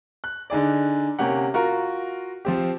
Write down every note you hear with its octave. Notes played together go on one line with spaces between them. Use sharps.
F#6
D3 D#4 G#4 D5
C3 A#3 C#4 G4 F#5
F4 F#4 A#4
F3 C4 G4